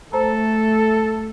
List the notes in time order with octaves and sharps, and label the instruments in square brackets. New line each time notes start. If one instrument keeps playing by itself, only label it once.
[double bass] A3 [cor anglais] A4 [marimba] C5 A#5